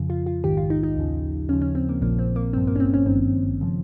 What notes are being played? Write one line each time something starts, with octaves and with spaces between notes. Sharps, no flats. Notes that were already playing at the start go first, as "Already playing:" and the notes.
Already playing: F2 C#3 F3
F4
F4
A#1 G#2 D#3 G4
F4
D#4
D#4
D#2 C#3 F3
D#2 C#3 F3 C#4
C#4
C4
A#3
A#1 A#2 F3 A#3
C4
A#3
G1 G2 F3 C4
A#3
C#4
C4
C#4
G#1 G2 D#3 C4
C#3 F3